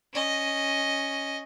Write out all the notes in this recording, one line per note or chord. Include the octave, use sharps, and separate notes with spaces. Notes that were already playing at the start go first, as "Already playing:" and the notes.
C#4 D#5